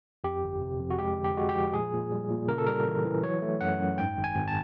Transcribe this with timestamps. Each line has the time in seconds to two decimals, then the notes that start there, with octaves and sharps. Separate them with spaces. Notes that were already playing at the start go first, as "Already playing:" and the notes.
0.24 F2 G4
0.44 G1
0.61 C3
0.80 F2
0.90 F#4
0.99 G#3 G4
1.18 D3
1.24 G4
1.37 G#3 F#4
1.49 G4
1.55 F3
1.73 A#2 G#4
1.93 A#2
2.12 G3
2.30 A#2
2.48 C#3 A#4
2.58 A4
2.67 G3 A#4
2.86 E3
3.05 E3
3.23 F#3 C#5
3.42 A3
3.61 F#2 F#5
3.80 F#2
3.98 G#2 G5
4.17 G#1
4.24 G#5
4.35 G#1
4.48 A5